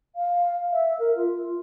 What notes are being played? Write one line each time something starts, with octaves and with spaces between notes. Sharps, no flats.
F5
E5
A#4
F4